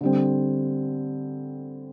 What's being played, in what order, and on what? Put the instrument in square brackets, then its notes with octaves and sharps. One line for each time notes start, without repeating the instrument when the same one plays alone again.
[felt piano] D3 G3 C4